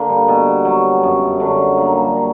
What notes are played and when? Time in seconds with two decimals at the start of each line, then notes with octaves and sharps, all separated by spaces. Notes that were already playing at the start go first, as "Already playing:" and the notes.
Already playing: D3 A#3
0.09 G3
0.28 B2
0.65 F#3
1.03 F#2
1.40 D3 F#3
1.78 A#2 A#3
1.92 G3
2.16 F#3